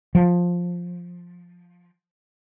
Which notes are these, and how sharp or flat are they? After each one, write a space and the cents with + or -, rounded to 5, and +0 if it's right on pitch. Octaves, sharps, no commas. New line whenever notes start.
F3 +10